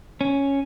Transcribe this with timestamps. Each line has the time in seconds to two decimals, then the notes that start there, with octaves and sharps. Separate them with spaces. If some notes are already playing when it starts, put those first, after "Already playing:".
0.21 C#4